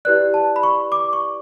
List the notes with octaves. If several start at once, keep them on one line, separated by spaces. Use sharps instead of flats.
E4 G4 B4 D5 F#6
A5
B5
C#6
D6
C#6